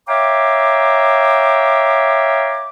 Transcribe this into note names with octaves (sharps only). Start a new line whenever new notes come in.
C#5 E5 F5 G5 A#5 D6